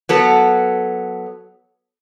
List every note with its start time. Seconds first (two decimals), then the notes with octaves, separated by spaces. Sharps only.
0.09 F#3 B3 A4